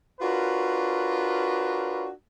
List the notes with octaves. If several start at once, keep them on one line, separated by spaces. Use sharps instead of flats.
D4 F4 F#4 A#4 B4 C#5